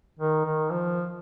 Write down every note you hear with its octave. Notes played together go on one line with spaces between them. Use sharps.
D#3
D#3
F3